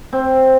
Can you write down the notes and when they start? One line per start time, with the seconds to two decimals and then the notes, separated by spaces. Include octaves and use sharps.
0.13 C4